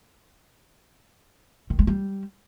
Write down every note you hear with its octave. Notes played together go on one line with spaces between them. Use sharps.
D#3
G#3
G3